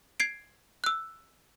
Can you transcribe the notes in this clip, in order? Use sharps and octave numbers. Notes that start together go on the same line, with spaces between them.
G#6 C7 D7
E6 F#6